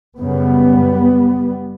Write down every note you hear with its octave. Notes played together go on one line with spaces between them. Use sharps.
F#2 C#3 G3 B3